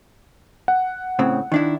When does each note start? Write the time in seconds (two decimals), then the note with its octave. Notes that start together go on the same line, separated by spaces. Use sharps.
0.68 F#5
1.19 A2 C#3 C4
1.52 D#3 D4 E4